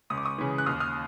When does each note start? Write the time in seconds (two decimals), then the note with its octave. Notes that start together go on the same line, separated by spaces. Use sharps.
0.10 C#2 D#6
0.18 D6
0.25 C#6 D#6
0.38 C#3 E3
0.58 F#6
0.66 D#2 D#6 F6
0.80 D#6 F6